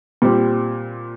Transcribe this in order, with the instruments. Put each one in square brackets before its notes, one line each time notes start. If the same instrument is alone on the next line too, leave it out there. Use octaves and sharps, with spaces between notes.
[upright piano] A#2 G3 C4